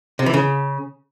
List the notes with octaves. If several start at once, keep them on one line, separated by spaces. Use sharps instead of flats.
C3
E3
C#3